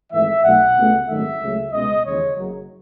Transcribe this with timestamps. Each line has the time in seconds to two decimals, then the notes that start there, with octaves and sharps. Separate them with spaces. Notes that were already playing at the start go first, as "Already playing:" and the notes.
0.13 G#1 G#2 E3 A3 E5
0.44 B1 B2 A3 F#5
0.76 C#2 B2 A3
1.08 G#1 F#2 D#3 A3 E5
1.41 C#2 C#3 F#3 A3
1.72 C#2 B2 G#3 D#5
2.05 D#2 C#3 E3 G#3 C#5
2.37 F#1 F#2 C#3 F#3